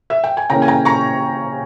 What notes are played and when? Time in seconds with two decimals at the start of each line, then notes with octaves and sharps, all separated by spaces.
0.10 E5
0.24 G5
0.37 G#5
0.50 C#3 E3 A#3 C#4 G5 A#5
0.62 G#5
0.68 G5 A#5
0.85 A#5 C#6